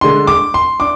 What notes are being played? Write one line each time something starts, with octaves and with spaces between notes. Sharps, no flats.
D3 G#3 D4 C6
D6
C6
D4 D6